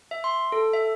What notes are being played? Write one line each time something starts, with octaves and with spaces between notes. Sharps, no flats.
E5
C6
A4
E5